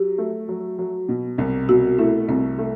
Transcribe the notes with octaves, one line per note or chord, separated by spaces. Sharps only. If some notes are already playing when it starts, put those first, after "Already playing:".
Already playing: F#3 G4
A3
F#3
F#3
B2
C2
B2 F#4
A3 E4
C2 C4
A3